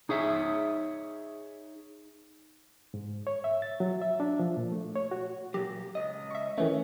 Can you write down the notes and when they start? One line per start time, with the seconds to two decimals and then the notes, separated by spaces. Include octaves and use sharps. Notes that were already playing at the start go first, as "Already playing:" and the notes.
0.09 D#4 G#4 C#5 E5
2.94 G#2
3.27 C#5
3.44 E5
3.62 A6
3.80 F#3
4.02 E5
4.20 D4
4.39 F3
4.57 A#2
4.72 A3
4.95 C#5
5.11 F#4
5.54 A#2 F#3 G4
5.95 C#2 D#5
6.31 E5 C#6
6.58 D#3 E3 A3 C#4